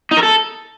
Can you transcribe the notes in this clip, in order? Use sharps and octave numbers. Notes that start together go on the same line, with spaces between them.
D#4
A#4
A4